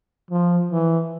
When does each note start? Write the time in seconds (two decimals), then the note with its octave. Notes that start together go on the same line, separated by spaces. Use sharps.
0.31 F3
0.71 E3